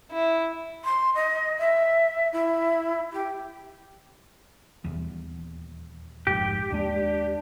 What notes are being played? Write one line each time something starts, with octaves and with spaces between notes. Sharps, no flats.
E4
C6
D#5
E5
E4
G4
D#1 E2
F1 A#1 G#2 G4
D#2 G#3 D4